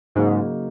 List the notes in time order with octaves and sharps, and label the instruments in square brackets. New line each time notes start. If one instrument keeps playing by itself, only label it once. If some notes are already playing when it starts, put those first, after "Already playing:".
[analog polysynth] G#2 [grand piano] C#3 F#3 A#3 D#4 F#4